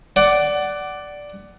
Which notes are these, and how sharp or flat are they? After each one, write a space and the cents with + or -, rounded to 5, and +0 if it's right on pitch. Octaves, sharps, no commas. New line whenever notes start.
D5 +0 F#5 +20